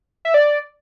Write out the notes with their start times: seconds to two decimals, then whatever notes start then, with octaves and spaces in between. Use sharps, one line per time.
0.25 E5
0.34 D5